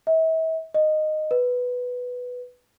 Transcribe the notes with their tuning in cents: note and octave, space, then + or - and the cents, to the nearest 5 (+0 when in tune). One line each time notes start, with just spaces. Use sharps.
E5 -40
D#5 -10
B4 +0